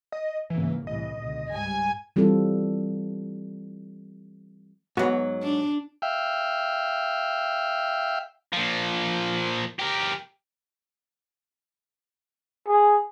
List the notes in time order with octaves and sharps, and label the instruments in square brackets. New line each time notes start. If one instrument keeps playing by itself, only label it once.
[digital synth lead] D#5
[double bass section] G#2 C#3 A#3 [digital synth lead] E3
[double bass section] C2 A2 E3 [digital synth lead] D#5
[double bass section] C#2 B2 D3
[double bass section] G#2 G3 [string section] G#5
[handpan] E3 G3 C4 F4 A4
[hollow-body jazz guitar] G#2 F#3 [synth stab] B3 F#4
[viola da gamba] D4
[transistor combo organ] E5 F5 G5
[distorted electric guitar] A#2 F3
G4 A#4
[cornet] G#4